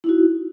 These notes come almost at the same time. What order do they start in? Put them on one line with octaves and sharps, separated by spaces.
E4 D#4 F#4